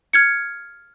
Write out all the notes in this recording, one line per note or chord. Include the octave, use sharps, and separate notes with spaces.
F6 G#6 C#7